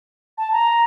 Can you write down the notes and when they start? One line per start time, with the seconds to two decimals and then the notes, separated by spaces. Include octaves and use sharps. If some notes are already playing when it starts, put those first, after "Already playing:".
0.38 A5
0.52 A#5